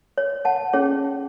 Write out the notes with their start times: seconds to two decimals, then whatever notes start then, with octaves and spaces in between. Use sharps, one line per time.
0.18 C#5
0.45 F#5 A5
0.73 C#4 G#4 C#5